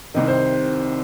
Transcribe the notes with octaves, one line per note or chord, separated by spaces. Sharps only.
C2 C3 D#3 D#5
C5